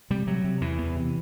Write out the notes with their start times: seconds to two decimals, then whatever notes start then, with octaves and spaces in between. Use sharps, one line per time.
0.10 C3 G3
0.27 C3 F#3
0.44 C3
0.61 E2 E3
0.78 E2
0.95 C3